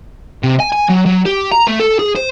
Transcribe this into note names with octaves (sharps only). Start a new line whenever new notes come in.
C3
G#5
G#5
F#3
F#3
G4
A#5
A3
A4
G#4
C5